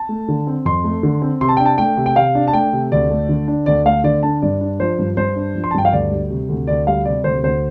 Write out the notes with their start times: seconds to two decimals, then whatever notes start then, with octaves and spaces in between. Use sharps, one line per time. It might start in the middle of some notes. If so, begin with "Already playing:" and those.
Already playing: A5
0.09 A3
0.28 D3
0.47 C4
0.65 F2 C6
0.84 A3
1.03 D3
1.22 C4
1.41 C3 C6
1.49 A5
1.57 D4 G5
1.66 A5
1.78 A3 G5
1.97 C3
2.06 G5
2.16 C3 F5
2.35 D4
2.47 A5
2.53 A3 G5
2.73 C3
2.92 D2 D5
3.10 A3
3.29 D3
3.48 D4
3.66 D2 D5
3.85 A3 F5
4.04 D3 D5
4.23 D4 A5
4.42 G2 D5
4.61 D4
4.80 F3 C5
4.99 G2
5.17 G2 C5
5.36 D4
5.55 F3
5.64 C6
5.71 A5
5.74 G2 G5
5.85 F5
5.92 D2 D5
6.11 G3
6.30 C3
6.49 D2
6.67 D2 D5
6.87 G3 F5
7.05 C3 D5
7.24 D2 C5
7.43 D2 C5